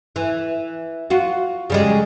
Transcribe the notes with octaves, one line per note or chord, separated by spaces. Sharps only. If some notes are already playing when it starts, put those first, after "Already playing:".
E3
F4 F#4
C#3 G3 G#3